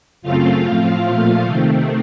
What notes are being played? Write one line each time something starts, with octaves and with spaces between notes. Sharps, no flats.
F#2 C#3 A3 C4 F4 F5
A2 F3 C4 F4 F5
A#2 F3 A3
C3 D#3 A3 C4